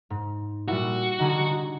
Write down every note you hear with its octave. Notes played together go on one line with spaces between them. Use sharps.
G#2
A#2 G3 E4 F#4
D3 G3 D#4 G#4